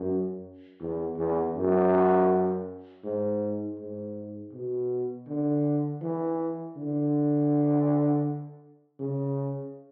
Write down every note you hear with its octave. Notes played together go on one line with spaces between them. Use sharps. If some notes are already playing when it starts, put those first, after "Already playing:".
Already playing: F#2
E2
E2
F#2
G#2
G#2
B2
D3
E3
D3
C#3